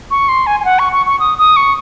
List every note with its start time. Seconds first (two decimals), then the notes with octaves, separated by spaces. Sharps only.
0.11 C#6
0.29 C6
0.47 G#5
0.60 G#5
0.65 F#5
0.79 C#6
0.93 C#6
1.06 C#6
1.20 D#6
1.38 D#6
1.56 C#6